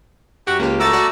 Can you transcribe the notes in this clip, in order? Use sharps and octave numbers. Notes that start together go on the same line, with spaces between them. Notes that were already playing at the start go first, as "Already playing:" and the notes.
F#2 F#4 G4
C#2 A#3 G4
A3 F#4 A#5 D6 E6 A6
F#4 D5